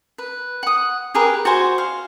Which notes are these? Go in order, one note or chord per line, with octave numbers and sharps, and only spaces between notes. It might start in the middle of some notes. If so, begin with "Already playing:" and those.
B4
F#5 D#6
G4 G#4 A#4 B4
F#4 C5 G#5
F5